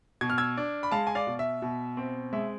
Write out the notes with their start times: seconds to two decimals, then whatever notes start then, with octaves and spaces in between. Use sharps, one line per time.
0.21 B2 G#6
0.30 F6
0.38 E6 G#6
0.57 D4
0.83 B5
0.91 G#3 F5 A5
1.07 G#5
1.15 D5 F5
1.27 B2
1.39 E5
1.62 B2
1.97 C4
2.33 G#3 E5